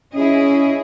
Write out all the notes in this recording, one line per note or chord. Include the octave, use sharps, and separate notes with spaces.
C#4 E4 G#4 D#5